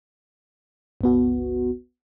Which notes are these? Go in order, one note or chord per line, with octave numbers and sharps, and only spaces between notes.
G1 C#2 B3 F#4